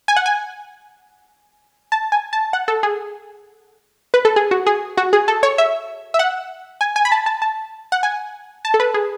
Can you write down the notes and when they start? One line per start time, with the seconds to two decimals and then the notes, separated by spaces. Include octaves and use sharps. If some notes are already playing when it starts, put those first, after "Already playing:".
0.08 G#5
0.16 F#5
0.26 G#5
1.92 A5
2.12 G#5
2.33 A5
2.53 F#5
2.68 A4
2.83 G#4
4.14 B4
4.25 A4
4.36 G#4
4.51 F#4
4.66 G#4
4.97 F#4
5.13 G#4
5.28 A4
5.43 C#5
5.58 E5
6.14 E5
6.19 F#5
6.81 G#5
6.96 G#5
7.05 B5
7.12 A5
7.26 A5
7.42 A5
7.92 F#5
8.03 G#5
8.65 A5
8.74 A4
8.80 B4
8.94 G#4